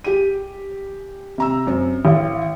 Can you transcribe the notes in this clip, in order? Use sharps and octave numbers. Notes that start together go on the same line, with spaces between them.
G4 G#4 D#7
C3 A#5 E6
F#2 C4
A1 F5